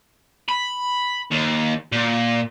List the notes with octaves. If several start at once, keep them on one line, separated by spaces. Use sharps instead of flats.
B5
D#2
A#2